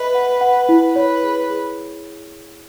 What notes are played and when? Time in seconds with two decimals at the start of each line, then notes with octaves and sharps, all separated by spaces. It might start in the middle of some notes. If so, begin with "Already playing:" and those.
Already playing: B4 D#5 E5
0.14 F#5
0.41 F#5
0.69 E4
0.96 B4 C#5
1.23 G#4
1.50 G#4